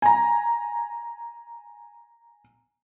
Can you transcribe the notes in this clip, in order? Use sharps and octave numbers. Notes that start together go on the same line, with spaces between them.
G#5 A#5